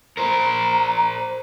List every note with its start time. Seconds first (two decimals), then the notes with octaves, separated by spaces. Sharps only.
0.17 A#4 C5 A#5